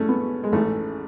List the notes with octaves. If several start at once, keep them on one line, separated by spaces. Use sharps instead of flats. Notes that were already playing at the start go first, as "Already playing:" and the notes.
Already playing: A1 G#2 A3 C#4 D4
B3
G#3
A1 G#2 E3 A3